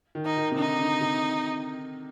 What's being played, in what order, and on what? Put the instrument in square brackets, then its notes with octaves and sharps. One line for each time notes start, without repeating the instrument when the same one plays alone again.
[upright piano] D#3
[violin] D#4
[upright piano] D#3
C3
[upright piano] D3 [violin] D#4
[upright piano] D3
C3